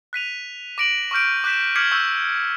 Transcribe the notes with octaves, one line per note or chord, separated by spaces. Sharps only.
F#6 B6 D#7 F7
D6 A#6 D7 D#7 F#7
C#6 D6 F6 G6 D7
D6 F#6 G6 B6 E7
D6 F6 G#6 B6 C#7 F#7
C#6 E6 G6 F#7